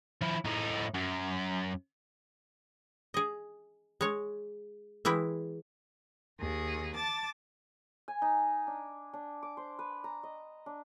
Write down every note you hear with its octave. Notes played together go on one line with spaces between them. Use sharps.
F3 E4
A2 D#4
F#2
G#4 D#5
G#3 C#5
E3 G#3 E4 G5
D#2 G#4
A5 D6 A6
G#5
D#4
D4
D4
D6
C5
B4
A#5
D#5
D4